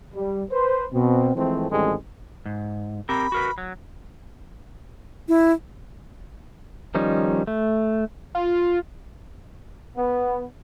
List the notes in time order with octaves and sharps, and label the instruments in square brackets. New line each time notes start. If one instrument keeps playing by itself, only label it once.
[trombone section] G3
B4 C5
B2 C4
E3 F3 G#3 A3 C4
A1 D#3 G3 G#3 C4 A4
[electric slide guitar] G#2
[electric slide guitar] C4 G4 A#4 [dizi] B5
[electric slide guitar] F#4 A#4 B4
F#3
[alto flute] E4
[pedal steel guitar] D#3 F3 G3 C#4 D#4
A3
[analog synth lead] F4
[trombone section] B3